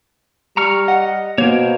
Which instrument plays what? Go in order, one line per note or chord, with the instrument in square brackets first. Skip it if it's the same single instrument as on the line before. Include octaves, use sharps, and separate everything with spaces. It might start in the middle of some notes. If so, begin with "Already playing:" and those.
[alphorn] G3 [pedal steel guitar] A#5 C#6 F6
[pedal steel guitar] D#5 [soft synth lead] F#5
[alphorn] B2 [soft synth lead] A#3 [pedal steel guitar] A#4 C5 C#5